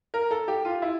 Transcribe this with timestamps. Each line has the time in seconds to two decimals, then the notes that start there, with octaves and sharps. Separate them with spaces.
0.14 A#4
0.31 A4
0.48 G4
0.65 F4
0.82 E4